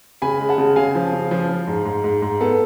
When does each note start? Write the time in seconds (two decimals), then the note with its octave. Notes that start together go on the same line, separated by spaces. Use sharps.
0.22 C#3 G#5 B5
0.40 G#3
0.49 F#5 A5
0.58 C#3
0.76 C#3 F5 G#5
0.95 F3
1.13 C#3
1.31 F3
1.49 F3
1.67 G#2
1.85 G#2
2.04 G#2
2.22 G#2
2.41 B3 A4